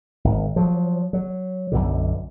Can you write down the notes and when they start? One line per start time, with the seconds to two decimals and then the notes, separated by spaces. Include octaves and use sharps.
0.25 G#1
0.56 F3 F#3
1.13 F#3
1.72 B1 F#2 B2 D3